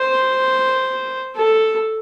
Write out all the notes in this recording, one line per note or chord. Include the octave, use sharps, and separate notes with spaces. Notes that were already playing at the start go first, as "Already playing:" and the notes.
Already playing: C5
A4